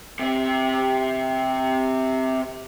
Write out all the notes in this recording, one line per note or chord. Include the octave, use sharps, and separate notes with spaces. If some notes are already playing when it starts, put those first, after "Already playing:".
C3 C4